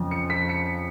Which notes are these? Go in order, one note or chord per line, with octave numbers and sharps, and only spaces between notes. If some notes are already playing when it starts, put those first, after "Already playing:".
Already playing: F2 C#3 F3
C#7
B6
C#7